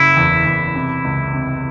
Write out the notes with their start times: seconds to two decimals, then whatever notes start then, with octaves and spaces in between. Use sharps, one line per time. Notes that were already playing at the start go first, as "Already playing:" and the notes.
Already playing: F#1 C#3 E4
0.17 E2
0.46 E2
0.75 C3
1.05 C#2
1.34 C3